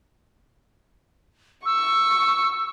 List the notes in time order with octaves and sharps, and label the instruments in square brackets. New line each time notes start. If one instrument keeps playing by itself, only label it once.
[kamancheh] C#6 [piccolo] E6